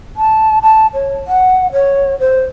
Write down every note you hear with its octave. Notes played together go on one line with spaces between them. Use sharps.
A5
A5
C#5
F#5
C#5
C5